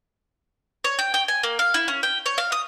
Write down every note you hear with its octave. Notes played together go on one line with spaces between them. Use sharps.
C#5
G5
G5
G#5
A#3
F5
E4
C#4
G5
C#5
F5
D#6